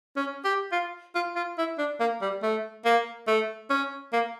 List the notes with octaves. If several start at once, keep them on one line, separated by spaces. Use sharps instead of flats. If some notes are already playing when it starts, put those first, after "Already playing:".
C#4
G4
F4
F4
F4
E4
D4
A#3
G3
A3
A#3
A3
C#4
A#3